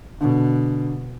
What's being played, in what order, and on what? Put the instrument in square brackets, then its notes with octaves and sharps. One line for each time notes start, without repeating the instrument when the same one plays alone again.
[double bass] B2 [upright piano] D3